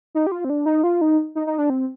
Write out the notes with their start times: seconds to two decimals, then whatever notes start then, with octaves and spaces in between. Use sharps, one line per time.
0.15 D#4
0.27 G4
0.32 F4
0.45 C4
0.50 D4
0.66 D#4
0.83 F4
1.01 D#4
1.35 D#4
1.47 D#4
1.58 D4
1.70 C4